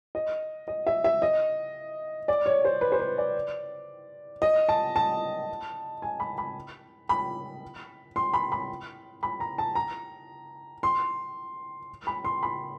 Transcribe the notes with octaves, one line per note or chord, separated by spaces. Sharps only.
D#5
D#5
E5
E5
D#5
D5
C#5
C5
B4
C5
B4
D5
D#5
A5
A5
G#5
B5
B5
B5
C6
B5
B5
B5
A#5
A5
A#5
C6
B5
C6
B5